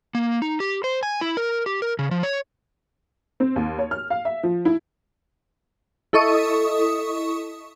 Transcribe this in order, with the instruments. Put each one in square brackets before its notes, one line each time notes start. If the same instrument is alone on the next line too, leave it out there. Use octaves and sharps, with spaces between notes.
[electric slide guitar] A#3
D#4
G4
C5
G#5
E4
A#4
G4
A#4
C#3
F3
C#5
[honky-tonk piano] C4
D#2
C#5
F6
F5
E5
F3
E4
[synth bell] E4 A4 D#5 C#6 D#6